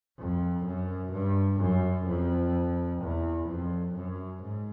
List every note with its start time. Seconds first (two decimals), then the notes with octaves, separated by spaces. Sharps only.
0.19 F2
0.66 F#2
1.13 G2
1.60 F#2
2.07 F2
3.02 E2
3.48 F2
3.95 F#2
4.43 G#2